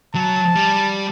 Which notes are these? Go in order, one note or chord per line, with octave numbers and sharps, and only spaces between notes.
F#3 A5
G3